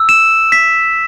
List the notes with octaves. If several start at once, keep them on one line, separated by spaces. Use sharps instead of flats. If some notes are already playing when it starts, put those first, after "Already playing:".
Already playing: E6
E7
B6